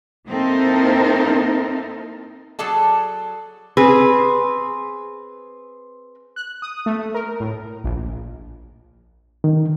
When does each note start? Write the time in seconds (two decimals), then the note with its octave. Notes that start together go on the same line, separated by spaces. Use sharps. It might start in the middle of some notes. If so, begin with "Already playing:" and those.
0.29 A#3 C4 D#4 E4 A4 A#4
2.59 F#3 G#4 A4 D5 A5
3.77 C4 G#4 B4
6.36 F#6
6.62 D#6
6.86 A3
7.14 A#4
7.40 A2
7.84 A#1
9.44 D#3